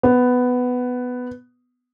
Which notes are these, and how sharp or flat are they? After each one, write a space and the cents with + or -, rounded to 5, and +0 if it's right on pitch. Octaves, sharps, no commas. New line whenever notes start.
B3 +10